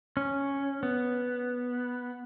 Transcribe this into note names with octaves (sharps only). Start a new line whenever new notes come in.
C#4
B3